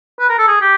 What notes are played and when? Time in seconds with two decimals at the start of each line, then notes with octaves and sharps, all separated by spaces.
0.19 B4
0.29 A#4
0.38 A4
0.47 G#4
0.61 G4